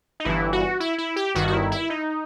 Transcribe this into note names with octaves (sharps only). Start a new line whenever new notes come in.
D#4
G1 G2 E3 E4
F#4
E4
E4
G4
G1 G2 D#3 F#4
F#4
E4
E4
D#4